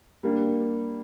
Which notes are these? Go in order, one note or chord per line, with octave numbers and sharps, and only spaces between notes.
G3 A#3 D4